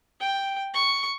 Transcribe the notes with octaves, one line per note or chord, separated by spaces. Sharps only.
G5
C#6